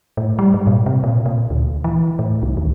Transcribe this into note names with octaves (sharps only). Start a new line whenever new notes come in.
A2
G3
G#2
A#2
C3
A#2
A#2
D2
E3
A2
C2
D#2